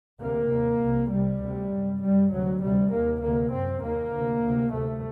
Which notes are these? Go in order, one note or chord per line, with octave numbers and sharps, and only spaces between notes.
D2 C3 A#3
D#2
C2 C3
C2 C3 G3
D2 C3
F#2
F#2 G3
D2 C3 F#3
D2 C3 G3
D#2 A#3
D2 C3 A#3
F#2 C4
D#2 A#3
D2 C3
D2 C3
D2 C3 A3